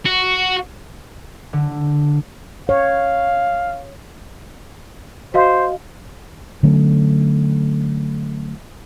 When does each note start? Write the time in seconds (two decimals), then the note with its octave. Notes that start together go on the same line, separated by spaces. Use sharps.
0.06 F#4
1.53 D3
2.69 C#5 F5
5.34 F#4 C5 D#5 F5
6.63 D3 F#3 A3 C#4